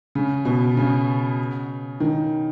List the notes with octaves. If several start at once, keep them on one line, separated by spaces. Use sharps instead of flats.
C#3
B2
C#3
D#3